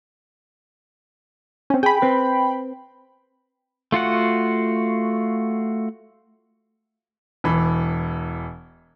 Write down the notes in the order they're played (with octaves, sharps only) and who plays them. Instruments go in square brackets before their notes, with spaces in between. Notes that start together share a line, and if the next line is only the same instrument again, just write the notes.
[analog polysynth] C4 C#4
[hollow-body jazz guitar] G#4 [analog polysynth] G5 B5
[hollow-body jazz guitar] C4 B4
[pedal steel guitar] A3 F4 F#4 F#5
[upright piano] E1 E3 B5